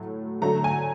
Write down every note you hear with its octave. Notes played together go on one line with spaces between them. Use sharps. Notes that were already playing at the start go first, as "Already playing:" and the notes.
Already playing: A2 F#3 A3
D3 F#3 A3 A#5
G#5